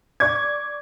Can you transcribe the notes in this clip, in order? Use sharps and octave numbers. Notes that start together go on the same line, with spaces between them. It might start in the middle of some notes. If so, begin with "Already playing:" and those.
D5 C#6 D6 G#6